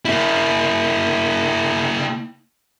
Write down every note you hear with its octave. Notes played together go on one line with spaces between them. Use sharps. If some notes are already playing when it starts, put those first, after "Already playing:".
A#3 E4